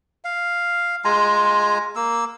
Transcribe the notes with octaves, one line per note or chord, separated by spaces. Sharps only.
F5
G#3 F4 G#5 A#5
A#3 E6